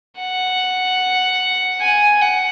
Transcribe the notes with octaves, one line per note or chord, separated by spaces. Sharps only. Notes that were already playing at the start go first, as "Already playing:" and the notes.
F#5
G#5
F#5